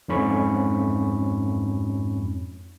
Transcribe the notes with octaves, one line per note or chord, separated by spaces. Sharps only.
F2 G#2 C#4 B5 C#6